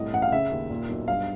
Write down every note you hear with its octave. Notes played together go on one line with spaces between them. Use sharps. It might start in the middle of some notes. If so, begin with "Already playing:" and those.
Already playing: C2 A2 D#5
A1 F#5
F5
C#3 E5
D#2
A#2
B1
G2 F5